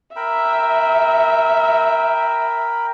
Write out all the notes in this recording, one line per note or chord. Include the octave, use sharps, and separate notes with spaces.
A#4 E5 G5 B5